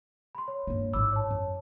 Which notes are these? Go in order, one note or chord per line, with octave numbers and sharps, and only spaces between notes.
B5 C6
C#5
G2 A#3
A1 G#2 B5 D6 E6
C#5 A5
F#2